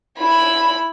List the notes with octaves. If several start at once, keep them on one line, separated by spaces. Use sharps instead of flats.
E4 B5